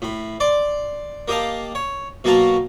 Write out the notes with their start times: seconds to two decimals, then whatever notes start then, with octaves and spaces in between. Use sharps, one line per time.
0.02 A2 B5
0.40 D5 C6 D6
1.28 A#3 G4 D#5 F5 A5
1.75 C#5
2.24 B2 F#3 A#3 F#4 A5 A#5